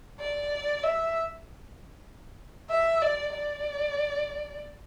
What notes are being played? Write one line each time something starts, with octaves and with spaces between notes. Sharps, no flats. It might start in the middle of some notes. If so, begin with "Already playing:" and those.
D5
E5
E5
D5
D5